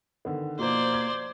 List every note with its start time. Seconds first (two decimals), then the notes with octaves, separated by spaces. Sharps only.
0.25 D3 D#3 B3
0.59 B2 F3 A#3 C5 D5
0.94 G#6